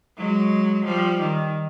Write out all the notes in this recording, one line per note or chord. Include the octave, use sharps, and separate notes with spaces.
F#3 G#3
F3 G3
D#3